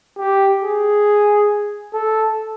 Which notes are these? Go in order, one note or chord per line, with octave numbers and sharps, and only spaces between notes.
G4
G#4
A4